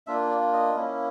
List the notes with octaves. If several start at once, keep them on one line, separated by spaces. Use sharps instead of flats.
A#3 D4 F4 E5
D5
D#5
A#3 C#4 E4